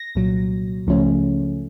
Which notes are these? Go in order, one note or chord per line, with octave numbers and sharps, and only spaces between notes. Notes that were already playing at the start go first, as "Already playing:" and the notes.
Already playing: A#6
C2 A#2 F#3
C#2 C#3 F3 A3 C#4